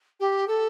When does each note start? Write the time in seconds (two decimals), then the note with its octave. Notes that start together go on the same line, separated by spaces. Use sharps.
0.20 G4
0.48 A4